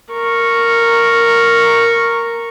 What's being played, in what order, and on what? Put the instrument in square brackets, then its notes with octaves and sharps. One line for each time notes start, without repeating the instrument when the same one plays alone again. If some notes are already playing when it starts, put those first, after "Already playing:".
[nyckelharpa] A#4 C#6